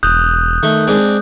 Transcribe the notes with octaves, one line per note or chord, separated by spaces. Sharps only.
E1 D#6 F#6 G6
D#3 A3
G#3 C4 D4